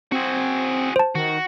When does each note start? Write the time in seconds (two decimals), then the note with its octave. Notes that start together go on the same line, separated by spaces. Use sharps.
0.12 C4 F#4 G#4
0.96 C5 A5
1.15 D#3 F#4